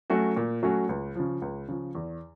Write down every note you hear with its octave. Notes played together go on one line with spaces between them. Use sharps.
F#3 A3 C#4 F#4
A#2
F#3 A3 C#4 F#4
C#2
C#3 F3
C#2
C#3 F3
E2